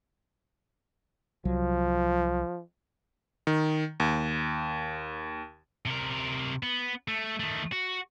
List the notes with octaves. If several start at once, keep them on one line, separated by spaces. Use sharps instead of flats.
C2 F3 F#3
D#3
D#2
C3 A#4
B3
A3
D#3 A3
F#4